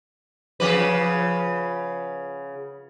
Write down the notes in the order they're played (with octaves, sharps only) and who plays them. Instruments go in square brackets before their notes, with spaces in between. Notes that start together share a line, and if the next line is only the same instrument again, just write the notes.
[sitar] C#3 F3 B4